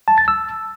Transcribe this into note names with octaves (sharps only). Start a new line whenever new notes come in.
A5
A6
E6